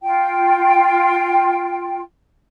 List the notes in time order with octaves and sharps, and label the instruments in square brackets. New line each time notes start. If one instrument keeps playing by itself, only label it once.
[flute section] F4 G5